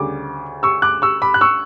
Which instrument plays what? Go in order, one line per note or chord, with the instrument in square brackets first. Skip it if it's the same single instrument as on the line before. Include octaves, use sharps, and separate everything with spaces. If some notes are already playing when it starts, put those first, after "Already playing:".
Already playing: [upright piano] D2 C#3 G3 D6
C#6 E6
D6 F#6
C#6 E6
B5 D6
F#6
C#6 E6